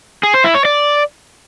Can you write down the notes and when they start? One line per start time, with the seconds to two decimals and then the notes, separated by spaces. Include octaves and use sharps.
0.23 G#4
0.34 C5
0.44 E4
0.55 C#5
0.65 D5